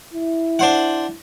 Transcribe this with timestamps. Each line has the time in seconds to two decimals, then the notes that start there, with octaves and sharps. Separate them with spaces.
0.13 E4
0.59 D4 C5 F#5